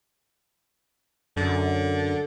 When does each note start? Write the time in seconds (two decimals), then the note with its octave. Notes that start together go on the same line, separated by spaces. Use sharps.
1.37 F#2 D3